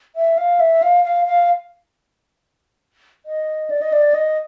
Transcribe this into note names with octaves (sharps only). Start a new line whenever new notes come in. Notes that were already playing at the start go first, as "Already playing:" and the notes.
E5
F5
E5
F5
F5
F5
D#5
D5
D#5
D5
D#5